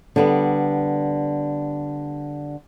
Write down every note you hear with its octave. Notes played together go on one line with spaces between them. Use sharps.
D3 G3 B3